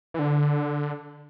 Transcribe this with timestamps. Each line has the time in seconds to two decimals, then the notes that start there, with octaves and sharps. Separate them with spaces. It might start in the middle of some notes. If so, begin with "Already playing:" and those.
0.14 E3
0.19 D3